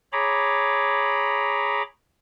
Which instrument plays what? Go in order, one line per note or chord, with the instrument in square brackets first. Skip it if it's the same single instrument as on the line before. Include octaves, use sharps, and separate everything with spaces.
[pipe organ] G#4 C#5 A#5 B5 D6